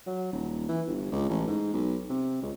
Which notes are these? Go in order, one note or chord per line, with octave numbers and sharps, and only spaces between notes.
F#3
D#1
E3
G1
C#2
A1
G#2
B1
C3
C#2